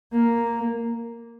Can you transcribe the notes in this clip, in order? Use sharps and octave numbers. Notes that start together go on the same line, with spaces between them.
A#3